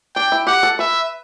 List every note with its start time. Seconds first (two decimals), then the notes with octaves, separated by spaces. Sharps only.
0.15 D4 G5
0.32 E4
0.47 G4 F#5
0.63 A4
0.79 B4 E5